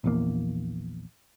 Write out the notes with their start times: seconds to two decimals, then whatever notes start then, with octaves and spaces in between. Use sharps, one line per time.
0.04 A#1 E2 A#3